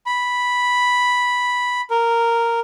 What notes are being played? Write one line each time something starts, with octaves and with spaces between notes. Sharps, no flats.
B5
A#4